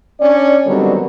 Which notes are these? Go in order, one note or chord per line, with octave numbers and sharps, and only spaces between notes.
C#4 D4 C#5 D5
D3 D#3 F#3 G3 B3 C4